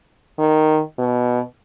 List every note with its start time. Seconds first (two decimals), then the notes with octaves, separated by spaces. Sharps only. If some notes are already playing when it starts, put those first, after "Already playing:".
0.39 D#3
0.98 B2